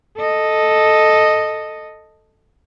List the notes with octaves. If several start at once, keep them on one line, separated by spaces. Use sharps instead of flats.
A4 D#5